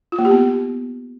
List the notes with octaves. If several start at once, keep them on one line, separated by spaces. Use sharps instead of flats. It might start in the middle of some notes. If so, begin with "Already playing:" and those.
F4
A#3
G4
B3